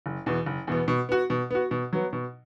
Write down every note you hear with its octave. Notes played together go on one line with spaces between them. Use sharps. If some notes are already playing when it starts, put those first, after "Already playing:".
F#1
E2 B2 B3
F#1
E2 B2 B3
B2
B3 F#4
B2
B3 F#4
B2
F#3 B3
B2